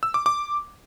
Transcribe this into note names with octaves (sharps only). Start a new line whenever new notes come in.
E6
D6
D6